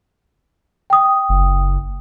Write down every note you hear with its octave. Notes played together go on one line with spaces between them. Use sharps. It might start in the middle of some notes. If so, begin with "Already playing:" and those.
G5 D#6
F#1